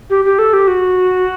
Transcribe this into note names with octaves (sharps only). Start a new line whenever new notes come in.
G4
G4
A4
G4
F#4